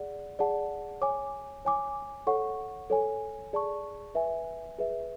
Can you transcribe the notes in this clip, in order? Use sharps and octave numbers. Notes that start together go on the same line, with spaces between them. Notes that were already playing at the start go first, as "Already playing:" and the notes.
Already playing: G#4 D5 F#5
G#4 D5 F#5 A5
C#5 G#5 D6
C#5 G#5 D6
A4 C#5 F#5 C#6
A4 C#5 G#5
G#4 D5 A5 C#6
B4 E5 G#5
G#4 B4 E5